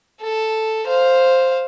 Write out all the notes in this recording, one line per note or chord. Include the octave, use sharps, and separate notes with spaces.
A4
C5 F5